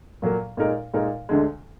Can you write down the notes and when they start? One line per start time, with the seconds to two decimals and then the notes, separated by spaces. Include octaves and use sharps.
0.22 A#2 F#3 A#3
0.57 A#2 G#3 D#4 A#4
0.94 A#2 G#3 D#4 A#4
1.29 D2 D3 G#3